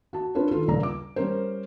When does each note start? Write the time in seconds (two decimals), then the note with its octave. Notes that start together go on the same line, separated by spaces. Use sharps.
0.13 F#4 A5
0.35 C#4 D4 F4 B4
0.51 D#3 F4 A4
0.67 D#1 A#1 C#3 D5 A#5
0.83 D6
1.16 G3 C#4 A#4 C5